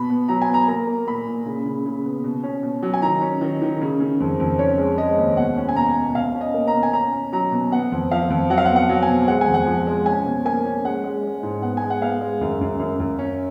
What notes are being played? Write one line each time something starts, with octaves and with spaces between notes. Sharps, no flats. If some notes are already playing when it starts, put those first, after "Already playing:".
Already playing: B2 B5
B3
F#3 A#5
G#5
B3 A#5
A#3 A#5
A#3
A#2 B5
A#2
C#3
C#3
C#3
B3
B2
C#4
B2
F#3
G#5
D#3 A#5
C#4
D#3
D#3
C#3
C#3
F2
F2
C#4 C#5
G#3
G#3 D#5
D#2
B2 F#5
C#4
G#5
B2 A#5
B2
B2 F5
C#4
D#5
A#3
A#5
B2
G#5
C#4 A#5
C#4
F#3 A#5
B2
B3 F#5
F2
F3 F5
F2
F#3 F#5
F5
F#5
B3
F#5
F#3
G#5
B2
G#3 F#5
G#5
F2
F#5
F3
G#3
C#4 G#5
B2
A#3 G#5
C#4
G#3 F#5
G#3
G#3
G#2
B3 F#5
G#5
G#3
F#5
B3 F5
G#3
F#2
F#2
F#2
F#2
C#4